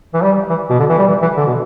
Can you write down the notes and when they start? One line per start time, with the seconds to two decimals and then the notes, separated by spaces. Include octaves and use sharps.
0.14 E3
0.22 G3
0.50 E3
0.70 B2
0.79 D3
0.89 E3
0.98 G3
1.09 E3
1.22 E3
1.37 D3
1.47 B2